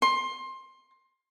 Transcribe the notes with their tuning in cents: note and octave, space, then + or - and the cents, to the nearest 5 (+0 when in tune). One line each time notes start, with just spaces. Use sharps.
C6 +20